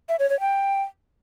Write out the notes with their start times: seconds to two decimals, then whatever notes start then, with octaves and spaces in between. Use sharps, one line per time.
0.09 E5
0.19 C#5
0.30 C#5
0.40 G5